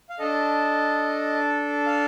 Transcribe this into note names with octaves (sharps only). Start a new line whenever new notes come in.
F5
D4 A4 D#5
F5